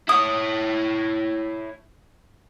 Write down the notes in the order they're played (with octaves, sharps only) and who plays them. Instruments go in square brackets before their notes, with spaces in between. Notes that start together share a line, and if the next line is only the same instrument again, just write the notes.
[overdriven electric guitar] E4 C#5 [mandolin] D#6